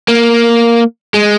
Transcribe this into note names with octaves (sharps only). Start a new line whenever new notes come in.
A#3
G#3